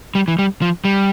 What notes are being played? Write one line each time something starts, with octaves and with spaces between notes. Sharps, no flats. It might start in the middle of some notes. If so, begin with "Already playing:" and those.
G3
E3
G3
F3
G3